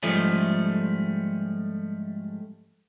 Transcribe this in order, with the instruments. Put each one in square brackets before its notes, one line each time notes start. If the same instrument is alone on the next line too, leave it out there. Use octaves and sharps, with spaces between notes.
[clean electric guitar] G#2 F3 G3 A3 C#4